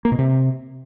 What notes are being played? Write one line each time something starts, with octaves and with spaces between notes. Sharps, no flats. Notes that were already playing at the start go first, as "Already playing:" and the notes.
A#3
B2
C3